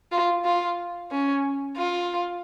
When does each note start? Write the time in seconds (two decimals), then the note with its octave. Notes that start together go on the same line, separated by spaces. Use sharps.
0.12 F4
0.45 F4
1.11 C#4
1.77 F4